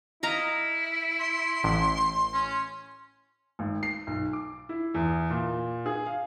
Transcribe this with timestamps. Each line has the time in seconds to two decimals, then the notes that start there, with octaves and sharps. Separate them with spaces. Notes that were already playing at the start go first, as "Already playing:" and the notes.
0.23 E4 D#5 F5 A#5
1.19 C6
1.64 A1
2.34 C#4
3.59 G#1
3.83 C7
4.07 B1
4.33 D6
4.69 E4
4.95 E2
5.30 A#2
5.86 G#4
6.07 F5